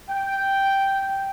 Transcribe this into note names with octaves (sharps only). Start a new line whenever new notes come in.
G5